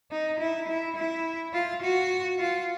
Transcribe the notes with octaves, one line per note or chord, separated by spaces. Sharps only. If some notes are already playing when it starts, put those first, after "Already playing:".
D#4
E4
E4
E4
F4
F#4
F4